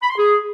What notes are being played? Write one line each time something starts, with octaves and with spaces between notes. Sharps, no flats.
B5
C6
G#4